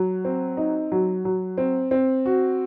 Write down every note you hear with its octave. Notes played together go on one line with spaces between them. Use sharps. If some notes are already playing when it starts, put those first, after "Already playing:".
Already playing: F#3
C4
D#4
F#3
F#3
C4
C4
F#4